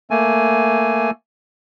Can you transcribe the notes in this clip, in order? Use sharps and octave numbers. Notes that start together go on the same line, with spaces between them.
A3 A#3 G#5